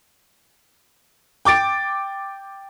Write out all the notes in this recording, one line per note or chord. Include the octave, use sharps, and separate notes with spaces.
G5 D6 A6 D7